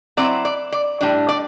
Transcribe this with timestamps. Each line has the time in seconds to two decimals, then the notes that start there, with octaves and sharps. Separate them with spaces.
0.17 F#3 C4 E4 D5
0.45 D5
0.72 D5
1.01 A2 G3 D4 D5
1.29 D5